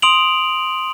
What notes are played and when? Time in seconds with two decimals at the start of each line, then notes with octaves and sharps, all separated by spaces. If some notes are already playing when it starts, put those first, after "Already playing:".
0.02 C6 D#6 D7 F7 F#7